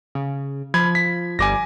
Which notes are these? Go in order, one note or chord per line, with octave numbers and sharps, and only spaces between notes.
C#3
F3 B5 G#6
B6
G1 G3 G#5 D6 A#6